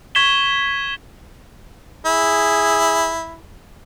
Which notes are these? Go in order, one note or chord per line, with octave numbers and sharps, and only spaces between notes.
C#6 G#6 B6 E7 G7
E4 G#4